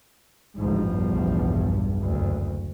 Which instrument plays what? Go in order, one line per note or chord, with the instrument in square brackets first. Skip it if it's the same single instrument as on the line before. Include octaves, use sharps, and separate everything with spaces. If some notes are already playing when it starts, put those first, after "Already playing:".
[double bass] A1 F3 [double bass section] D2 G#2
[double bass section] B1 E2 G2
[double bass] F#1 D2